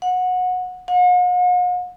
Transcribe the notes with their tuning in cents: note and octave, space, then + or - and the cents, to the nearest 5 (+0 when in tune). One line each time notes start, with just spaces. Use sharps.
F#5 -20
F#5 -45